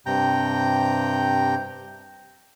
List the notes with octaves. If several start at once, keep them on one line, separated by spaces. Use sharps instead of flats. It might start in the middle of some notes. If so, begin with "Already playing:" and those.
G2 C3 G5 A#5 G6